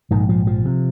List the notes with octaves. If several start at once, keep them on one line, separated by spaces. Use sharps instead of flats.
A#1 G#2 D#3
F3
F3
C3